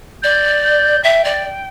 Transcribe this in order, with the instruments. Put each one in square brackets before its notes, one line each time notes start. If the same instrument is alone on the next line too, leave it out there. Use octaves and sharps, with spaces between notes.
[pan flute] D5 [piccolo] G6
[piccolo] G6
[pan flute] E5 [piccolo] G5
[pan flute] D5